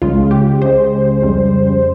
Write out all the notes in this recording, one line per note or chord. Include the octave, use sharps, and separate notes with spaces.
C#2 C#3 G#3 F4
G4
C#2 C#3 G#3 C5
F2 C#3 G3